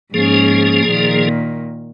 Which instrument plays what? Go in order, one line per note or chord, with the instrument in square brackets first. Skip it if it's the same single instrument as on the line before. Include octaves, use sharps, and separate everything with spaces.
[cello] G#2 C#4 [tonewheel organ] F3 A#3 G#4
[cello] A#2 D#3